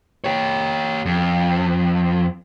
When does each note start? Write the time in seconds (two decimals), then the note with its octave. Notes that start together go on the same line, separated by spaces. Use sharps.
0.24 G4 C#5
1.06 F2